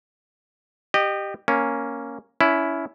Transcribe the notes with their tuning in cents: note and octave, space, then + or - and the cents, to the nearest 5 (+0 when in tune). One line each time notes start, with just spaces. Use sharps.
G4 +0 D#5 -25
A#3 +0 C#4 +0
C#4 +25 E4 +0